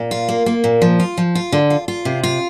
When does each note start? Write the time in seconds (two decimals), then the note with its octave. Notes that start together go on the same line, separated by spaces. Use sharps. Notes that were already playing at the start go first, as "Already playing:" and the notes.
Already playing: A#2
0.11 F4
0.29 A#3
0.46 A#3
0.64 A#2
0.82 F3
1.00 F4
1.17 F3
1.35 F4
1.52 D3
1.70 F4
1.88 F4
2.05 C3
2.23 F4